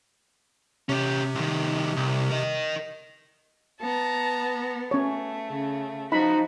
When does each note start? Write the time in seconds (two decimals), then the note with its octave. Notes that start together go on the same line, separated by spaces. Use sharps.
0.89 C3 C#4 G4
1.35 C2 D#3
1.97 C2
2.30 A#4 D#5
3.81 B3 A5 A#5
4.91 A3 C#4 C#5
5.48 C#3
6.12 F3 D#4 F#4 B5